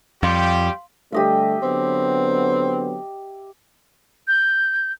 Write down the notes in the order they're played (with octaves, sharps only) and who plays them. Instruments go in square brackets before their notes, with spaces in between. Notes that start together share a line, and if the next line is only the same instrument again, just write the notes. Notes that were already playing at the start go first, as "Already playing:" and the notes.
[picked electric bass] F2 [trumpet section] G3 G4 [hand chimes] F5 C6
[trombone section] D3 G3 A3 [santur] G4 D#5 E5
[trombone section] D3 F#3 B3 [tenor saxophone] C4
[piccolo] G6